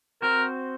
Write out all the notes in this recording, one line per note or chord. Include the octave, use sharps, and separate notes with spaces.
C4 F#4 A#4 C5